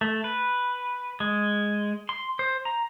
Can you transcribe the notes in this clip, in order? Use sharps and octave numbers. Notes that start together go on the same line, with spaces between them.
A3
B4
G#3
C6
C5
A#5